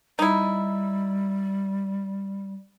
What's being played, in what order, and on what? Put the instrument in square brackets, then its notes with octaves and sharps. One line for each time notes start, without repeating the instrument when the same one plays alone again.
[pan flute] G3 [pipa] D#4 E4